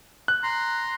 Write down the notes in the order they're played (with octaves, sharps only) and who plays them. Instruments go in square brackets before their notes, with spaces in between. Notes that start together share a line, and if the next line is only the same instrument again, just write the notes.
[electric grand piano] F#6
[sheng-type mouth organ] A#5 C6